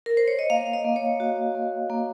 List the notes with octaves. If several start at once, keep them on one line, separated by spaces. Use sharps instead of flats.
A#4
C5
C#5
D#5
A#3 F5
D#5
A#3
C#5
F#4
A#3
A#3